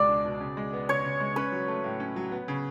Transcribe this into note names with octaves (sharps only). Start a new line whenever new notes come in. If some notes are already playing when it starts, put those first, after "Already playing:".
Already playing: C#2 B2 G#3 D5
D4
B2
C#3
G#3
B3
C#3 C#5
C#3
G#3
C#4 B4
F#3
A3
A2
C#4
F#3
B3
C#3